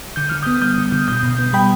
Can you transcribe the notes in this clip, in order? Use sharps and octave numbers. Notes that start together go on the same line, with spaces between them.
D3 G6
D3 F6
D#6 G6
B3
G3 D#6 G6
D3
D3
B2 D#6 G6
B2
B3
G3 G5 B5